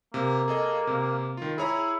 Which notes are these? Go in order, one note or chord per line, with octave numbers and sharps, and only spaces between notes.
C3 A#3
G#4 A4 D#5
C3
D#3 F4
E4 G#4 C#5 A#5